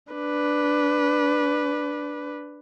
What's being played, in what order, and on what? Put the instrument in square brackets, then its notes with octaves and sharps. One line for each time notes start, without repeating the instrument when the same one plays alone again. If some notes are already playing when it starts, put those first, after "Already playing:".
[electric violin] D4 B4